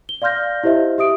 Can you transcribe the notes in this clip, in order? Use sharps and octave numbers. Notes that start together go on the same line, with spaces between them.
G7
D5 F5 C6 F6 G6 A#6
E4 G4 C5 D#5 E5
G4 E5 D#6 D7